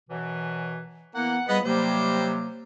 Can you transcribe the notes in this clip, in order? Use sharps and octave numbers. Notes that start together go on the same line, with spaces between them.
F#2 B2 E3
E3 A#3 B3 F#5
F3 G3 B3 G#4 D#5 F#5 B5
C3 F#3 G3 A#3 C5